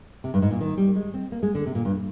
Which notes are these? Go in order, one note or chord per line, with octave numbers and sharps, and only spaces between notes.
C3
G2
G#2
A#2
D#3
G3
G#3
C4
A#3
G#3
D3
C3
A#2
G2